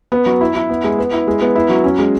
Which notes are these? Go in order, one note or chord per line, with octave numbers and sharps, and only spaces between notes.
B3
F#3
E4
E4
B3
G#3
B3
E4
G#3
B3
E4
F#3
C#4
G#3